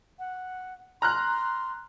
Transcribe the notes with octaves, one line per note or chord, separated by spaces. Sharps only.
F#5
A#5 C6 F6 F#6